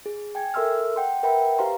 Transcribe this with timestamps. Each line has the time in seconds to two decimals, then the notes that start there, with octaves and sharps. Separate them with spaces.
0.06 G#4
0.35 G5 G#5 G#6
0.54 A4 A#4 E5 C6 E6 F6
0.96 F#5 G5 C6
1.23 A#4 B4 E5 F#5 G5 B5
1.59 G4 B4 C5 F5 A#5 C6